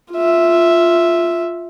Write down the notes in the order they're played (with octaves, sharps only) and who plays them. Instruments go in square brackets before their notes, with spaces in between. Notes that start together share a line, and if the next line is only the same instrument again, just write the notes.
[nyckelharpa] F4 E5